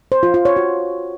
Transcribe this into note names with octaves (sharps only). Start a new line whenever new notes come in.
C5
F4
F4
C#5
F#4